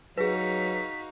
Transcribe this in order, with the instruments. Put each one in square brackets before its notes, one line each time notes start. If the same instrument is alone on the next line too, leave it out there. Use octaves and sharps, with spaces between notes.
[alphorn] F#3 [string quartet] D#4 F#4 F5 [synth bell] G#4 B4 [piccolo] B6